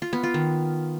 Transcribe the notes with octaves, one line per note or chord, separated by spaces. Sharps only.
F4
B3
F4
D#3